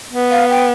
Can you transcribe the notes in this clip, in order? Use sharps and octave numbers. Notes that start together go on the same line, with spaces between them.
B3
F5
G5